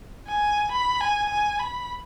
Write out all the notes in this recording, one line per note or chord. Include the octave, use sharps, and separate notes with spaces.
G#5
B5
G#5
G#5
B5